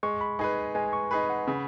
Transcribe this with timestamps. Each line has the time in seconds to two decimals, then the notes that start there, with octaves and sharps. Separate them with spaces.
0.03 G#3 C#6
0.21 B5
0.39 D#4 G#4 B4 G#5
0.75 G#3 G#5
0.93 C#6
1.11 D#4 G#4 B4 B5
1.30 F#5
1.47 C#3